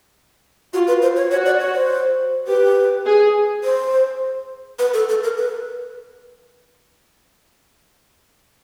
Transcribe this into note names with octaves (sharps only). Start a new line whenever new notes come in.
F4 F#4
B4
C5
C#5
F#4 C#5
D5
C#5
C5
G4 B4
G#4
C5
B4
A4
A4
A#4
B4